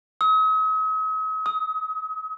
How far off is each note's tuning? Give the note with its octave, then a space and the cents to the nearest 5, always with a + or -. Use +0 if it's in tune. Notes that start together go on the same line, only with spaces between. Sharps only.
D#6 +45
D#6 +25